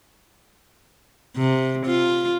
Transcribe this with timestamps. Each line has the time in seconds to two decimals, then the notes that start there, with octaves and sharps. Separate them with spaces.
1.37 C3
1.86 F4